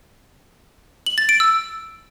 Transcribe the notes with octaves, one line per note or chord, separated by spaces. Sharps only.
F#7
A6
D7
E6